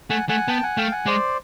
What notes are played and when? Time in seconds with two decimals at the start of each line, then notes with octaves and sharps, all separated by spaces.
0.10 A3 F#5 G#5
0.29 A3 F#5 G#5
0.48 B3 G5 A5
0.63 F#5 G#5
0.77 A3 F5 G5
0.92 F#5 G#5
1.06 G#3 C5 D5